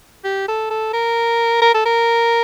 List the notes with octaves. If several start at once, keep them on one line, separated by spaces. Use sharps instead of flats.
G4
A4
A4
A#4
A#4
A4
A#4